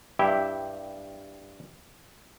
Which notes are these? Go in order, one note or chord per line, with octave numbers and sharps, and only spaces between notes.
G2 E4 G4 E5 G5